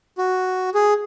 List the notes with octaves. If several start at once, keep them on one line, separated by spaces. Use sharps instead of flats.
F#4
G#4